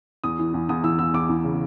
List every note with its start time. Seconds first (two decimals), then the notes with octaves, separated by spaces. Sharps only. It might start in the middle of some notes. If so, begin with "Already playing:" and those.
0.24 E2 D#6
0.39 E3
0.54 E2
0.69 E2 D#6
0.84 E3 E6
0.99 E2 E6
1.13 E2 D6
1.29 E2
1.44 C#3